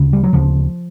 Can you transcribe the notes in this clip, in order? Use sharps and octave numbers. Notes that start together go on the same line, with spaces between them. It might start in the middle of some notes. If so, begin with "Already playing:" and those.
Already playing: D2 C#3
G3
F#3
D2 C#3 F3